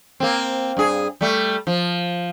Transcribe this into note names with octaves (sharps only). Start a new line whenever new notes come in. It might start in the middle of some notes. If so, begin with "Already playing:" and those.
A#3 C4
G2 G#4
G3 A3
F3